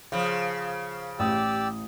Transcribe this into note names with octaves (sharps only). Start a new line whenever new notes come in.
C#3 F3 F5
A1 G4 D5 D#6 E6